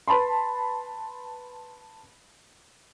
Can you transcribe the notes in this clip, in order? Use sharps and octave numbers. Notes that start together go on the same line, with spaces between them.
B4 A5 B5 C6